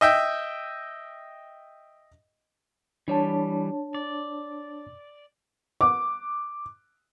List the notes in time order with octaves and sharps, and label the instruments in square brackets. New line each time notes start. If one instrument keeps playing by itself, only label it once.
[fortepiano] D#5 E5 G5
[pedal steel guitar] E3 G3 [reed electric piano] D4 C#5 A5
[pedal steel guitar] D5
[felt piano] D6